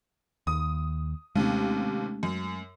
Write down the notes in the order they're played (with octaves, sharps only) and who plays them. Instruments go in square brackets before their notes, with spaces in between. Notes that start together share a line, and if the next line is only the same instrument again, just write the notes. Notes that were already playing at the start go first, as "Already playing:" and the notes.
[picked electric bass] D#2 [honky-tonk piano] D#6
[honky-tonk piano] D#2 C3 [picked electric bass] G#3 A3 C#4
[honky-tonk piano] F#2